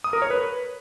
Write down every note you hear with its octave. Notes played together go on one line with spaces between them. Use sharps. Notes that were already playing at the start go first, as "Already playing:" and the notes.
D#6
A#4
C#5
B4